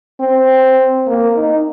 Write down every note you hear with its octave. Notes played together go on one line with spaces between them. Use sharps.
C4
A#3
D#4